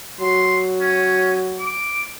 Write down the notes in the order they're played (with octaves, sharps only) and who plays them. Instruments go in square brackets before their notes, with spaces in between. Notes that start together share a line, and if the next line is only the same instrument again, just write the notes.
[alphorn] F#3 [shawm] C6
[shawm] C#4
D6